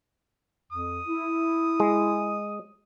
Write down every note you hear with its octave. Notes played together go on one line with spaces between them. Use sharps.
F2 D#6
E4
G#3